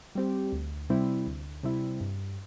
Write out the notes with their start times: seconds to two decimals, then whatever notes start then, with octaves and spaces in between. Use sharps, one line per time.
0.15 G3 C4 G4
0.52 D2
0.90 C3 G3 C4 E4
1.27 D2
1.63 C3 G3 C4 E4
2.01 G2